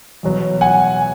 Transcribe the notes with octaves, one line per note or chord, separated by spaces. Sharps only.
E2 B2 F#3
F#5 G#5